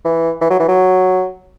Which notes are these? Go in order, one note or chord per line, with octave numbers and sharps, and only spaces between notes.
E3
E3
F#3
E3
F#3